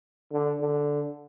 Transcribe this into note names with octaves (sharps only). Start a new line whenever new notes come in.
D3
D3